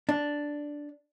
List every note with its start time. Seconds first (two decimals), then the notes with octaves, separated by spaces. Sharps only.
0.09 D4